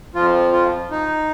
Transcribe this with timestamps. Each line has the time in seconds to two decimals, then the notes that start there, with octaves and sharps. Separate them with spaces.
0.15 F2 F3 F4
0.53 F4
0.91 D#4